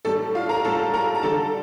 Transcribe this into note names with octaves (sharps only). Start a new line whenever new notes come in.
A2 G3 A4 A5
F4 F5
A#4 A#5
A2 G3 A4 A5
A#4 A#5
A#5
D3 G3 A4 A5